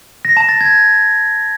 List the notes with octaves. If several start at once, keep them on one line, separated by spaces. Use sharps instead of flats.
A#6
A5
A6
G#6